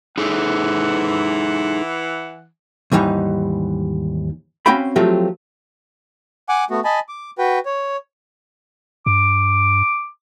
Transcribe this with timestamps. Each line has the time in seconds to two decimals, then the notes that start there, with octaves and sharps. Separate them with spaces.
0.18 E3 D#4 G#4 A4 F#5
2.92 D#2 G#2 E3 G3 D#4
4.66 C4 C#4 F#4 F5 G5 B5
4.96 F3 F#3 A3 C4 F4 G4
6.49 F#5 G#5 D6
6.70 A3 B3 F#4
6.84 D#5 G#5 A5 B5
7.08 D6
7.38 F#4 B4 G5
7.66 C#5
9.06 G2 D6